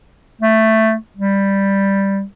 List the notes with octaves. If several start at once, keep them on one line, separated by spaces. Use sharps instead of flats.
A3
G3